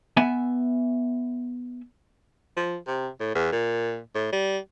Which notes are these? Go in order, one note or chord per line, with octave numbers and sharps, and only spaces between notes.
B3 E5 G#5
F3
C3
A2
E2
A#2
A2
G3